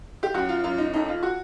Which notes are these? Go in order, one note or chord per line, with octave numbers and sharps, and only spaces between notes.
G4
F#2 F#4
F4
F#2 F4
D#4
F2 D#4
F4
F#4